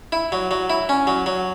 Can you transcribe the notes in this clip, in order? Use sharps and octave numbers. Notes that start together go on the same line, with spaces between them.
E4
F#3
F#3
E4
C#4
F#3
F#3